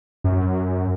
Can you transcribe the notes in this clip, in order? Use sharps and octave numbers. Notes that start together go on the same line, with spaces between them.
F#2